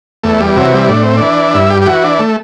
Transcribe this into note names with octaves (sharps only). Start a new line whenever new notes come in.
E2 A3
G3
C3 E3 F#3
G3
A2 D4
C4
E3 D4
G2 E4
G4
G4
E3 F#4
D4
A3